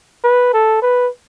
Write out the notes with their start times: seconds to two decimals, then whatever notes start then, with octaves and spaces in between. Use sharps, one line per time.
0.24 B4
0.53 A4
0.82 B4